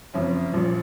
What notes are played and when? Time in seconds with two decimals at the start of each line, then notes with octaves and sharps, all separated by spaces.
0.14 F#1 F2 F3 C#4
0.53 A#1 A#2 F3